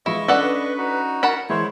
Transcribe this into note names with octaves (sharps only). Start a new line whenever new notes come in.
E3 G#3 E4 F4 D#5 C#6
C#4 D4 A4 B4 D5 F#5
D#4 F#4
A#4 F#5 A5 B5
E3 G#3 E4 C5 C#5